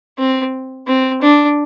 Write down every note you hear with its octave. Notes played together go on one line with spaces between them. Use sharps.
C4
C4
D4